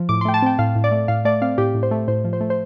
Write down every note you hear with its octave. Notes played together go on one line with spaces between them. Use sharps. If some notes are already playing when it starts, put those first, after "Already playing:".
Already playing: F3
A2 D6
C6
A3 G5
A5
C4 G5
A2 F5
A2
D5
A3
A2 F5
A3 D5
C4 F5
A2 G4
A2
C5
A3
A2 C5
F3
C5
A3
C5